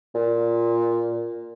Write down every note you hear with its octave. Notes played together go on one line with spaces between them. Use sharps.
A#2